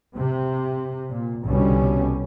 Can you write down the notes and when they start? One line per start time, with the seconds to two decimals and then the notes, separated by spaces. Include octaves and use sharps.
0.15 C3
1.11 A#2
1.46 C2 B2 D3 G3 C#4